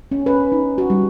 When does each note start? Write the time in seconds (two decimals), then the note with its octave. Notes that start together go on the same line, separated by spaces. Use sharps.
0.12 C#4
0.26 B4
0.52 D#4
0.78 F#4
0.90 G3